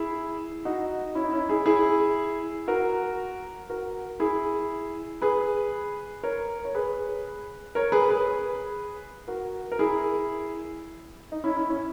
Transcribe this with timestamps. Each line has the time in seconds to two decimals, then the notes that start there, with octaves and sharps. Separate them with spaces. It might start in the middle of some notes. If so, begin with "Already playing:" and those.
Already playing: E4 G#4
0.65 D#4 F#4
1.15 C#4 E4
1.24 D#4
1.32 C#4 E4
1.49 E4 G#4
1.66 E4 G#4
2.68 F#4 A#4
3.70 F#4 A#4
4.20 E4 G#4
5.22 G#4 B4
6.23 A#4 C#5
6.65 C#5
6.75 G#4 B4
7.75 A#4 C#5
7.92 G#4 B4
8.09 G#4 B4
9.28 F#4 A#4
9.72 A#4
9.79 E4 G#4
11.32 D#4
11.44 C#4 E4
11.56 C#4 E4
11.69 C#4 E4